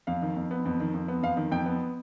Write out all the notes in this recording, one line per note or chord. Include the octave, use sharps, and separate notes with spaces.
F2 F5
D#3
F2
B3
F2
D#3
F2
B3
F2 F5
D#3
F2 G5
B3